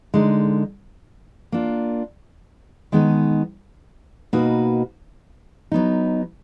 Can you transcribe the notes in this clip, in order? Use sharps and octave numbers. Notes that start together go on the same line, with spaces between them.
D3 G#3 D#4
A#3 D4 F4
D#3 G#3 B3 D#4
B2 A#3 D#4 F#4 B4
F#3 B3 D#4